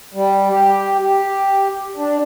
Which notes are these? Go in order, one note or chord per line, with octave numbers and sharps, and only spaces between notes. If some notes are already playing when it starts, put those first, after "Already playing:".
G3
G4
G4
D4